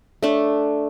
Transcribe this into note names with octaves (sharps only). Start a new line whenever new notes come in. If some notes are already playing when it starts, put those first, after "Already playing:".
A3 D4